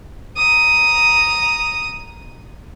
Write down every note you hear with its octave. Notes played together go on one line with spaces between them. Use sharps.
A#5 D#6